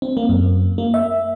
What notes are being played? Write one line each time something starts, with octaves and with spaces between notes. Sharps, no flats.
C4
A#3
F#2
A#3
E5